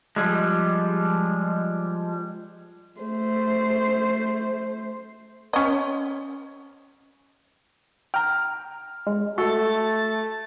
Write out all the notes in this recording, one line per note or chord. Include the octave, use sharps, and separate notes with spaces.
F3 G3 G#3
A3 C5
C#4 D#5
G5 A#5 F6
G#3
A3 F#4 A4 A6